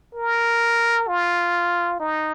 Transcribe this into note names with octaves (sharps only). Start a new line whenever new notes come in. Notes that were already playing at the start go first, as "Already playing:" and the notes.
A#4
F4
D#4